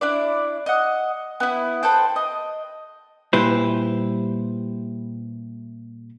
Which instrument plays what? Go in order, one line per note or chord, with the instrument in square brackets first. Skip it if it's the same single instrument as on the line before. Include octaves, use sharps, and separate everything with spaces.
[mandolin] D4 E4 D5
D#5 F#5
B3 E4
A4 B4 C5 G5
D#5
[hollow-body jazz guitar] A#2 G3 E4 B4 C5